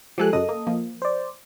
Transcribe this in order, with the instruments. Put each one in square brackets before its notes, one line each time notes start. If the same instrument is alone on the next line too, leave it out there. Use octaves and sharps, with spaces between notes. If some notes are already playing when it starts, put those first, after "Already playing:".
[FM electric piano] F3 G#3 G#5 [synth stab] G4 A4 F#6
[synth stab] F#2 C#3 [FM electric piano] A4 D#5 D#6
[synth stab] A#3
F3 A#3
[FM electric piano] C5 D5